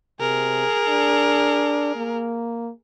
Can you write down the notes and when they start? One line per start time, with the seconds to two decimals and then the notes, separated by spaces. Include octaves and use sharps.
0.20 C3 G#4 A#4
0.89 D4
1.96 A#3